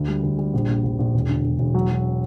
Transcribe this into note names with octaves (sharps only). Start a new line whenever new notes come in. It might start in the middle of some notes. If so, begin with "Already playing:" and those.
Already playing: D2
G3
D2
G3
A#1
A#1
A#1
A#1
E1
D3
E1
E1
F#3
F#3